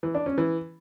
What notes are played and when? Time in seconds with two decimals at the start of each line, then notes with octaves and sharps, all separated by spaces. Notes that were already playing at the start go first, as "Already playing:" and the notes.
0.03 E3
0.15 D4
0.26 C#4
0.38 E3